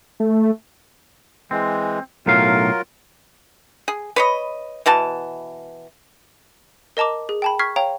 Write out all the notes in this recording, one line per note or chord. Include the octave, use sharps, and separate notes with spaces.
A3
E3 G#3 C4
B1 A2 F#3 F4 A#4 F5
G#4
B4 C#5 D#5
B2 E3 F#4 A5
A#4 D#5 A5 A#5 D6
G#4
G5 A5 B5
C#6 F6 G#6 B6 C7
C#5 F5 G5 A#5